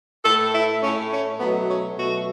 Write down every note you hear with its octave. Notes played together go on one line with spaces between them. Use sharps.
A2 A3 A4
E4
A2 A3 C#4
C#4
B2 F#3 A3 B3
C#4
B2 F#3 A3 F#4